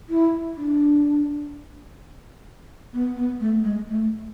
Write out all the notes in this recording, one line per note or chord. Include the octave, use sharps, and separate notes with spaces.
E4
D4
B3
B3
A3
G#3
A3